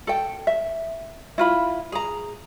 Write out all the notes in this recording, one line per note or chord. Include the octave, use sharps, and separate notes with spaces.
A4 G5
E5
E4 F4 B5
G#4 A#5